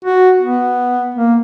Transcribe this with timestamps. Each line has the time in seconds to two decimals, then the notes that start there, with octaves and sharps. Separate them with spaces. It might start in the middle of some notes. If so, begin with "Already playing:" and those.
0.05 F#4
0.40 B3
1.15 A#3